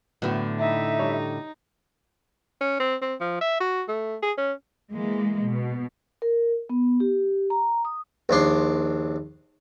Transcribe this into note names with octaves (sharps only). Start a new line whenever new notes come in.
A2 D3 F#3 B3 F#4
D#4 E5
G3 A4 C#5
C#4
C4
C4
F3
E5
F#4
A3
G#4
C#4
E3 G#3 A#3
B2
A#4
B3
G4
A#5
D#6
A#1 D#2 D4 C6